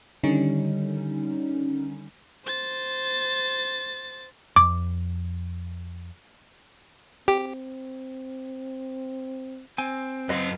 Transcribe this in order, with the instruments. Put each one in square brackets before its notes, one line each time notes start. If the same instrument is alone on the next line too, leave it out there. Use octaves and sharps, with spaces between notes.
[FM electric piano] D3 D#3 G3 C#4 D#4
[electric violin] C5 A6
[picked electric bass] F2 [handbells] D6
[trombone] C4 [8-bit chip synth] G4
[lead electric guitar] C4 [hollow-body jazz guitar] G#5
[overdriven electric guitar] F#2 F5 [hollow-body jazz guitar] B4 D#5 C6